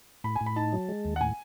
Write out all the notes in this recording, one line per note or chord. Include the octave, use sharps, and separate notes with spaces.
A2 B5
G#5
A2
B5
D#4 A5
F#3
G#3
D#2
F#5
A2 G#5